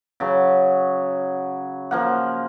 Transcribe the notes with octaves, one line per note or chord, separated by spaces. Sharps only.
C#3 F#3
F3 A#3 F#5